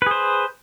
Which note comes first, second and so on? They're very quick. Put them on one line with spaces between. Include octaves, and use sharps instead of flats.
B4 G#4 C5